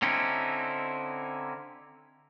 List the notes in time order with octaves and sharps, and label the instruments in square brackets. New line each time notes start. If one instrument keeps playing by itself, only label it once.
[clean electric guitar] D3 C4 C#4 D#4 E4